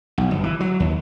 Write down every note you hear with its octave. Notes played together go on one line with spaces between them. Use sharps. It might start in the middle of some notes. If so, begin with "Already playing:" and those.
B1
G1
E3
F#3
D#2